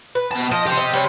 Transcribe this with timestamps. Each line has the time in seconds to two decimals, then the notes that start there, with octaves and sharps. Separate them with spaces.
0.15 B4
0.31 B2 A5
0.51 F3 D#5
0.66 G4 C5
0.77 D#5
0.93 G3 C#4